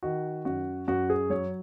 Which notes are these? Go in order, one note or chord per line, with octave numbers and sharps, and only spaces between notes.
D#3 F#4
F#2 F#4
F#2 F#4
G#4
F#3 C#5